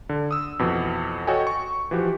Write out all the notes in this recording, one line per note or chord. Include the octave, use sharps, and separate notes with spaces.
D3
D#6 E6
F2 B2 E3
F#4 A4 C#5 D#5 G5 G#5
C#6
E3 F3 F#4 G4